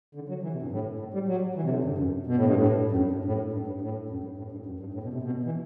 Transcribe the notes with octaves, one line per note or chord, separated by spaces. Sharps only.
D3
F#3
E3
C3
G2
A2
A2
G3
F#3
E3
C3
D3
G2
F#2
B2
A2
G2
A2
F#2
G2
G2
A2
G2
G2
A2
F#2
G2
A2
G2
F#2
G2
A2
B2
C3
B2
E3